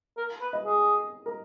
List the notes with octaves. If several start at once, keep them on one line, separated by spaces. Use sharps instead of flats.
A#4
B4
D#5
G#4
A#4